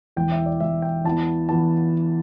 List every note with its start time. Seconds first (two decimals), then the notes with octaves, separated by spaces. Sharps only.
0.16 E1 E2 E3 G5
0.32 E5
0.46 D5
0.60 E1 E2 E3 E5
0.82 G5
1.05 E2 E3 B3 A5
1.49 E2 E3 B3 A5